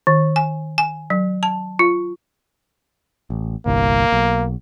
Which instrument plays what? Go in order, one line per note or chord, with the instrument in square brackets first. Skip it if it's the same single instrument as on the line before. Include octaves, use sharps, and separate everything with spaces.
[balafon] D#3
G#5
G#5
F#3
A5
F4
[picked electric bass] A1
[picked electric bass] G1 C2 [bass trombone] A#3
[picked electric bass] B1